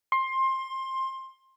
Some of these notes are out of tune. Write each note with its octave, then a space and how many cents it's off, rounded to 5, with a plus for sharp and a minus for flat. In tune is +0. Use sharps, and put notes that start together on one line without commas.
C6 +20